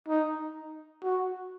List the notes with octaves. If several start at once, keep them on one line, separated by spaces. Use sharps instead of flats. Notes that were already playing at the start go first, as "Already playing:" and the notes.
D#4
F#4